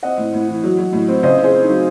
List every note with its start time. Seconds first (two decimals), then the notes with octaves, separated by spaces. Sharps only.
0.03 C4 D#5 F#5
0.18 A2
0.34 A2
0.48 E3
0.63 F#3
0.78 F#3
0.93 A2
1.08 C4
1.23 C#3 C5 D#5
1.38 C4
1.44 G#4 C5
1.53 C4
1.64 F#3 D#4